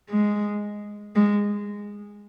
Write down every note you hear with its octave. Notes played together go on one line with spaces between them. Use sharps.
G#3
G#3